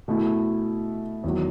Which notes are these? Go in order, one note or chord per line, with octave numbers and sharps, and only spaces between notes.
B2 A3 E4
E2 D#3 F#3